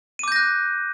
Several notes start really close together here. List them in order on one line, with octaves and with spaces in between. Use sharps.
D#7 D6 G6 A#6 F#6